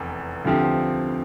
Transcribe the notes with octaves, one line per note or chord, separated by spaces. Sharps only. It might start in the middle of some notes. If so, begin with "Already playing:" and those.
Already playing: F1 E2
D2 D3 F3 C4 G4